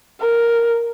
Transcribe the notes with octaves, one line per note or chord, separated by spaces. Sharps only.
A#4